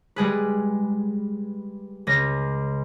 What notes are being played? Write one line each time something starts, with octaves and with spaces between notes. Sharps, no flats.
G3 G#3 G#4 B4
C#2 C#4 A#6